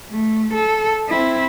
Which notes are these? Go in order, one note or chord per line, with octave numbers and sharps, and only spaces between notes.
A3
A4
C4 E4